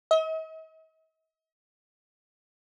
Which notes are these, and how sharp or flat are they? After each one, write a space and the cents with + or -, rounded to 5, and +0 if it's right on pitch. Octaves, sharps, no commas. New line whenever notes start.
D#5 +45